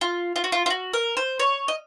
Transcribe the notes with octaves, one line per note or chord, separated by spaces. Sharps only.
F4
F4
F#4
F4
F4
F#4
A#4
C5
C#5
D#5